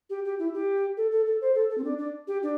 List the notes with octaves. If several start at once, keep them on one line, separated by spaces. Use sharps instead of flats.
G4
G4
E4
G4
A4
A4
A4
C5
A4
A4
C4
D4
D4
G4
D4